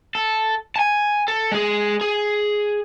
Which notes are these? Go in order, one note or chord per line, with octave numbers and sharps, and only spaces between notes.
A4
G#5 A5
A4
G#3 G#4
G#4